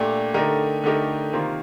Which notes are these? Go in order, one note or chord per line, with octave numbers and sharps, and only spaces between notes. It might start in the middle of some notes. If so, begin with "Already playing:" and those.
Already playing: A#2 A3 D4 G4
D3 A3 D#4 G4 A#4
D3 A3 D#4 G4 A#4
C3 D#3 A#3 F4 C5